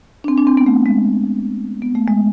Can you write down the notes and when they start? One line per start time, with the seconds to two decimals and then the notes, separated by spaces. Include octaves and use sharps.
0.24 D4
0.28 C4
0.37 D4
0.47 C4
0.57 B3
0.66 A3
0.86 G#3
1.82 B3
1.95 A3
2.07 G#3